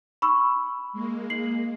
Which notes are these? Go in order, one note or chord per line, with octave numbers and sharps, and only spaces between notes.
B5 C#6 E6
G#3 A#3
C7 F#7